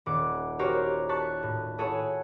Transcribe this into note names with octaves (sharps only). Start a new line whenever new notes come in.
D#1 F#5 D6
F#4 G4 A#4 C5 C#5
A5 C#6 F#6 A6 B6
A2
E4 G#4 A4 C#5 F#5